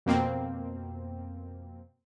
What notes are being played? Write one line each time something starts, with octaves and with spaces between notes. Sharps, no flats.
F2 B2 A#3 C4